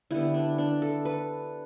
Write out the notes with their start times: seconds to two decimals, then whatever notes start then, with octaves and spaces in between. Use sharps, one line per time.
0.11 D3 G3 B3 E4
0.34 D4
0.58 D4
0.82 A4
1.05 B4